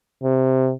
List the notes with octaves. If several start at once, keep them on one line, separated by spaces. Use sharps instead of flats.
C3